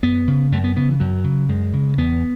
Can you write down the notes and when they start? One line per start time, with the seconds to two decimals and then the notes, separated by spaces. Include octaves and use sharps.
0.03 F#2 B3
0.28 C#3
0.52 F#2 A3
0.64 B3
0.76 C#3 B3
0.89 E3
1.00 F#2 F#3
1.24 C#3
1.49 F#2 G#3
1.73 C#3
1.98 E2 B3